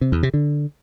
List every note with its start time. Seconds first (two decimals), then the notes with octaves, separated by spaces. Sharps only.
0.01 C3
0.12 E2
0.23 C3
0.34 D3